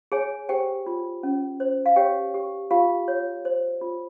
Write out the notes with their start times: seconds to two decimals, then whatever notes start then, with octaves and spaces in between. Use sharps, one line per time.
0.12 G#4 C#5 G#5
0.49 G4 C5 G5
0.86 F4
1.23 C#4
1.60 C5
1.86 F5
1.96 G4 C#5 G5
2.34 G4
2.71 F4 G4 F5
3.08 C#5
3.45 C5
3.81 F4